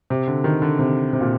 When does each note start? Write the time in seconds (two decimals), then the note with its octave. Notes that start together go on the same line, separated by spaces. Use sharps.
0.10 C3
0.27 D3
0.44 D#3
0.62 D3
0.79 C3
1.13 C3
1.21 A#2